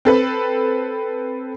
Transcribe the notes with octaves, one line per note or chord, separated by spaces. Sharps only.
C4 A4 B4